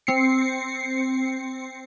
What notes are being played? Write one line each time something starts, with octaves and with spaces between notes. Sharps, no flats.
C4 C7 C#7